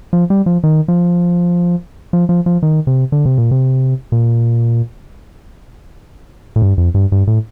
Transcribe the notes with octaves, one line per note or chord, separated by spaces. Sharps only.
F3
G3
F3
D#3
F3
F3
F3
F3
D#3
C3
D3
C3
A#2
C3
A#2
A2
G2
F2
G2
G2
A2